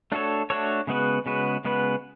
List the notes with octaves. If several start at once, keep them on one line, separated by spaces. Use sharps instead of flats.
A3 D4 F#4 A4 C#5
A3 D4 F#4 A4 C#5
C#3 G#3 B3 F#4 B4
C#3 G#3 B3 F#4 B4
C#3 G#3 B3 F#4 B4